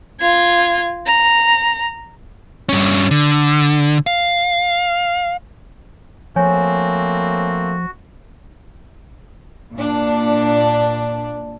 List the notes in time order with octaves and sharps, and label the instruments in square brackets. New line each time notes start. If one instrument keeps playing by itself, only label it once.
[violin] F4 G#6
A#5
[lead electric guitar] G2 C#4
D3
F5
[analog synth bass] F3 [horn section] A3 A#3 C4 [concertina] F#4 [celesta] C#5 G#5
[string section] A#2 D4